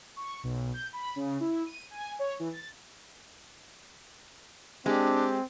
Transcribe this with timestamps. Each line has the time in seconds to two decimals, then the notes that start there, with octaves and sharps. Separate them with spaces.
0.16 C#6
0.43 B1
0.74 G6
0.93 B5
1.16 C#3
1.40 E4
1.66 D#7
1.91 G#5
2.19 C#5
2.40 E3
2.53 A6
4.86 G#3 C4 D4 G4